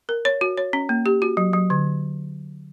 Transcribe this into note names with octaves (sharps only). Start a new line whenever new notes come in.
A#4
C#5
F#4
C#5
C#4
A#3
G4
F#4
F#3
F#3
D3